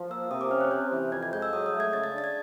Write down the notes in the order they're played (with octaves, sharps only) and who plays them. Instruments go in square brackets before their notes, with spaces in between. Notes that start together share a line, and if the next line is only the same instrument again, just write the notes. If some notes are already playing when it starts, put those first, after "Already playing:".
Already playing: [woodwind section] F3
[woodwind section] A#3 [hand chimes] E6
[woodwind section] C3 [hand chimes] D#6
[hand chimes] D6
[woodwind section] C#4 [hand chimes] F6
[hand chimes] F#6
[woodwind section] C3 [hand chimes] G6
[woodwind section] E3
[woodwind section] F2 [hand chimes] G#6
[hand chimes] G#6
[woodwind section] G#3 [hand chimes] G6
[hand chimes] E6
[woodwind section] F#3 [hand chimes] D#6
[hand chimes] D#6
[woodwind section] A3
[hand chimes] G#6
[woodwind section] C#3 [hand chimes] A6
[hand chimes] A6
[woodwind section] D4 [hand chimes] A6
[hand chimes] G#6